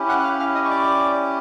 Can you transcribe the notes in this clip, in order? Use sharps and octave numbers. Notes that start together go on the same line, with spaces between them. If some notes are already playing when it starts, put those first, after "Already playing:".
Already playing: C#4 E4 G4
F#5 F#6
F#6
F5 F6
F5 F6
D#5 D#6
C#6
D5 D6